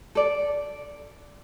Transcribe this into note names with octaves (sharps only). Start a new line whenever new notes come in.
A4 D5